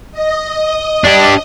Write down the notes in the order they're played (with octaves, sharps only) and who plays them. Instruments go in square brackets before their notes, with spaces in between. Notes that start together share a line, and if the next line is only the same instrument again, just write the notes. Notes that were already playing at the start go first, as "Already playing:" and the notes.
[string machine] D#5
[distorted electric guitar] D4 G4